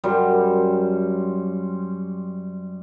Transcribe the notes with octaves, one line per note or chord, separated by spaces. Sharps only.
F#2 G3 C5